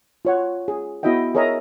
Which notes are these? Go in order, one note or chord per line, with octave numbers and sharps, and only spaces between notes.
F4 C#5 F#5
G#4
B3 E4 F#4 D#5 E5 G5
G#4 A#4 C#5 D#5 E5 A#5